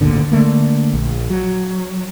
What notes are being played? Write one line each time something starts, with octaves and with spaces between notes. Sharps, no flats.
G#1 D2 A#2 D3
D3 A3 A#3
A#1
F#3